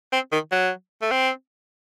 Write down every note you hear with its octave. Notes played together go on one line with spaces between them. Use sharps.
C4
D#3
F#3
A3
C4